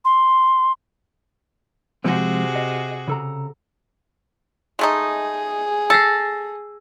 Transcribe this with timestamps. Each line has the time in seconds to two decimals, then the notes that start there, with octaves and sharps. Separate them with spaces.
0.05 C6
2.04 C3 F3 G#3 C4 F#4 G#4
2.56 D#5
3.08 C#3 A4 A#5
4.79 G#3 A3 D#4 G#4
5.90 A4 E6 A6 A#6 C7